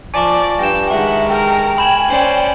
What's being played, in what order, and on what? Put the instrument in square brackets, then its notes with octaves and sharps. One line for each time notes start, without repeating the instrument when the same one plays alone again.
[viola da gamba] F3 [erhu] D5 [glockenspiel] G#5 A5 C#6
[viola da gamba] G2 [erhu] G5 [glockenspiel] A#6 E7
[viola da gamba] D#3 G#3 [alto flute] E5 [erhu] F#5 [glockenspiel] C#6
[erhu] A#4 [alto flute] G5
[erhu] G#5 [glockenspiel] B5 E7 F#7
[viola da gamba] C#4 C5 D5